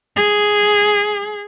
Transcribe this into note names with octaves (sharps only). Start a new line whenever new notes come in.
G#4